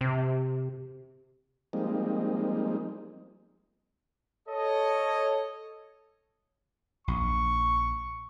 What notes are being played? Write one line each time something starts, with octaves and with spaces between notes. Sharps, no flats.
C3
F3 G3 G#3 A#3 C4 D#4
A4 C#5 D#5
A#1 C#6